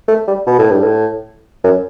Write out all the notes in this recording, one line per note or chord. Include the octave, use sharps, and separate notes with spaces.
A3
G3
B2
A2
G2
A2
F#2